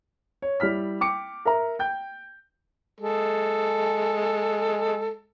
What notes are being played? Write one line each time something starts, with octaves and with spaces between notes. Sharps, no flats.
C#5
G3 E4 F6 B6
G5 D6 C#7
A#4 E5 A#5
G5 G6
G#3 A4